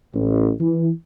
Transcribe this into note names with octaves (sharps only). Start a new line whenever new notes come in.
A1
E3